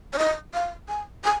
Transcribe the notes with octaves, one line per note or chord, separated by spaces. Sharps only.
C#5
D#5
F5
G#5
G#5